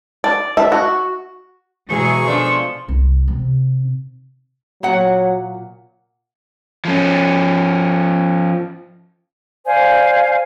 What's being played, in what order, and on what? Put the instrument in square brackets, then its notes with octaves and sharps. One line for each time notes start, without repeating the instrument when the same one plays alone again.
[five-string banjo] D5
E5
F#4
[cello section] B2 G#3 G#4 [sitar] E3 F#3 [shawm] C#6
[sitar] F3 A3 D4
[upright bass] C2
C3 D#3
[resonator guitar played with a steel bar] A#2 F#5 [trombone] F#3
[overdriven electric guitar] F3 C#4
[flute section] C5 D5 F5 G#5